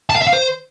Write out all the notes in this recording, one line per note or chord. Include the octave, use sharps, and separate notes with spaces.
A5
F5
E5
F5
C5